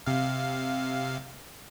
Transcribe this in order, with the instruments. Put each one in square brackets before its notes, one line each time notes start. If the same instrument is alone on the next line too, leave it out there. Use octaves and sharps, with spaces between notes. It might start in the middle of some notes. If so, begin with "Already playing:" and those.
[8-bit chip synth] C3 F5